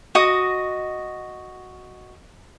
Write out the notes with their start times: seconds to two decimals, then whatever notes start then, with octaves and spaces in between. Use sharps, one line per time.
0.15 F#4 D#5 D#6